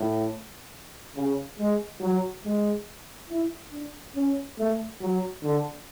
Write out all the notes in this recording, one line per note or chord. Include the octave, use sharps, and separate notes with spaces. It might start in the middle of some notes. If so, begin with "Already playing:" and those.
Already playing: A2
C#3
G#3
F#3
G#3
E4
D4
C#4
A3
F#3
D3